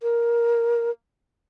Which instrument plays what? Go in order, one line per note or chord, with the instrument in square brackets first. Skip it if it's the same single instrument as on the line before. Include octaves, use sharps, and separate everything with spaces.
[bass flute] A#4